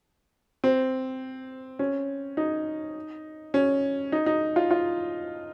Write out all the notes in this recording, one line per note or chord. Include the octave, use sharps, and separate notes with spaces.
C4
C#4
D#4
C#4
D#4
D#4
F4
F4